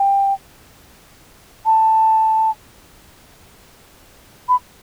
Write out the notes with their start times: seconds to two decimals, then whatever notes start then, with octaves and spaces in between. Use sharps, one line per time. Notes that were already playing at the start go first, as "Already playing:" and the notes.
Already playing: G5
1.65 A5
4.49 B5